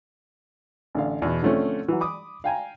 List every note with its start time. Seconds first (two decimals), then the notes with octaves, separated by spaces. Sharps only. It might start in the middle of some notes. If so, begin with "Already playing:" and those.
0.95 A1 D3 F5
1.22 E2 B2
1.42 D3 F3 A3 C4 C#4
1.88 E3 F#3
2.01 B5 D6 D#6
2.44 F5 G5 G#5 A#5